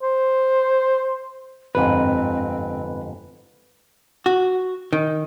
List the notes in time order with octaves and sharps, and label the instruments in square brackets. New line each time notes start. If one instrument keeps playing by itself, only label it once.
[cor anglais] C5
[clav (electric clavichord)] G1 F2 G#2 [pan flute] C4 [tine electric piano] B4
[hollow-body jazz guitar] F#4
D#3